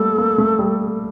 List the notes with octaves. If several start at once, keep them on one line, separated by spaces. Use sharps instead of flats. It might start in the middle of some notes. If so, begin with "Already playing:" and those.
Already playing: G3 A3 A#3 A4
A#3
A3
G3